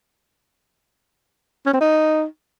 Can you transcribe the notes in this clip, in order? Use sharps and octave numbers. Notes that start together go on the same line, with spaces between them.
C#4
C4
D#4